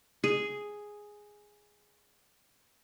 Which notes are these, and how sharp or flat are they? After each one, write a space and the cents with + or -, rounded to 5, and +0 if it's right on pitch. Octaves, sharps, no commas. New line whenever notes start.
G#4 +0